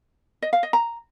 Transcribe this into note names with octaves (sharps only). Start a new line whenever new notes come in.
D#5
F5
D#5
A#5